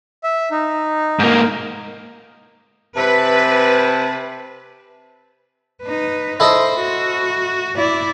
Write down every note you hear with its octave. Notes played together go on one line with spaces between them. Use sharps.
E5
D#4
G#2 A#3
C3 B4 A5
D#4 B4
E4 A4 C5 D#5
F#4
E4 D5